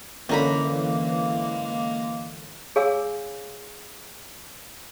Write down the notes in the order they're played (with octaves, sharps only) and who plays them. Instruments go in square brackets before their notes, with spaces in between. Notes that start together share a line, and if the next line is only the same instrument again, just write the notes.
[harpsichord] F#2 D3 [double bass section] E3 [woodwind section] G#3 A#3 [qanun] C#4 A#5 B5
[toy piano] G#4 C#5 F5 G#5 D6 E6